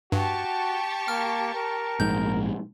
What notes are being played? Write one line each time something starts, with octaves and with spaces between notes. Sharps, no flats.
G2 F#4 G4 A5 C#6
A#3 F6
A#4
A#1 G#2 G6